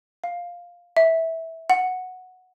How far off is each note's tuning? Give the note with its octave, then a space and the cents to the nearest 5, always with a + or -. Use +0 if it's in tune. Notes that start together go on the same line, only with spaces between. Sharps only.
F5 +5
E5 -15
F#5 -5